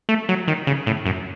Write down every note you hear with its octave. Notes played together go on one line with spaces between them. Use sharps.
A3
F#3
D#3
C#3
A2
F#2